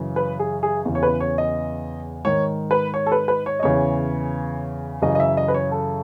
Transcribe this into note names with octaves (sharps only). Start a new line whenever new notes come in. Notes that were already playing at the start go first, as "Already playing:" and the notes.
Already playing: F#2 C#3 E3
B4
G#4
G#4
E2 C#3 E3
C#5
B4
C#5
D#5
G#2 D#3 C#5
B4
C#5
A4
B4
B4
C#5
D#5
E2 C#3 E3 C#5
F#2 C#3 E3 D#5
D#5
E5
D#5
B4
C#5
A4